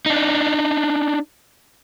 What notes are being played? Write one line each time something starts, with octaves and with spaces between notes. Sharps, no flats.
D4 D#4